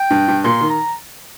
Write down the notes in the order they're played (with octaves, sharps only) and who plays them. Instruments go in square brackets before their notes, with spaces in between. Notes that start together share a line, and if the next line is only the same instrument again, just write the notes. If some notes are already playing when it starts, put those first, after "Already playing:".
Already playing: [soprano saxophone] G5
[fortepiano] G2
G2
[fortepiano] A#2 [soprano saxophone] C6
[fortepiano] D#3
[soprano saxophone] A#5